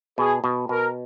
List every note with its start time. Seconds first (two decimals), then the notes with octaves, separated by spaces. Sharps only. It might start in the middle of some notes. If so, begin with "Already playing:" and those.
0.18 B2 G#4
0.44 B2
0.69 B2 A#4